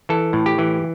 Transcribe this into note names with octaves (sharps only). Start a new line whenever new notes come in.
E3 A4
A2
G4
E3